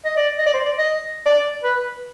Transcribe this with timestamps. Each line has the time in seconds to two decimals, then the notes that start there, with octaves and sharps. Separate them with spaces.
0.05 D#5
0.17 D5
0.39 D#5
0.46 D5
0.54 C5
0.65 D5
0.78 D#5
1.26 D5
1.63 B4